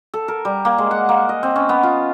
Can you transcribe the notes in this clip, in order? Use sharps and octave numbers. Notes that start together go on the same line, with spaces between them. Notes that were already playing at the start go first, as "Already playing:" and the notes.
A4
A#4
G3
A#3
G#3
F#5
A#3
D#5
C4
C#4
B3
F4